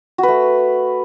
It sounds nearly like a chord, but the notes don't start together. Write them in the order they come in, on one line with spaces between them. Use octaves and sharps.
F#4 B4 A3